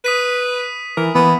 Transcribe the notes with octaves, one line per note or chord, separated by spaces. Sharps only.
B4 D#6 B6 D#7
E3 A#4
E3 A#3 B3